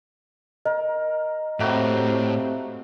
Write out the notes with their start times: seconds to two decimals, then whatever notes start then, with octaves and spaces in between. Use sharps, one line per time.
0.65 A#4 D#5
1.60 A2 A3 A#3 C4 F#4 G4